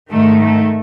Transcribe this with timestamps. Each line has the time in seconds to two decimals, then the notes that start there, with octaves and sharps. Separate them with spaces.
0.11 G#2 D#3 A3
0.41 A3